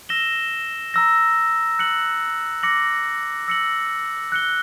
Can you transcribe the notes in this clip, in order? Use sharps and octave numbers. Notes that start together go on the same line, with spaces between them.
E6 A#6 E7 G7
A#5 E6 A#6
F#6 C#7 F#7
D6 A#6 C#7 F#7
E6 A#6 C#7 F#7
F#6 C#7 G7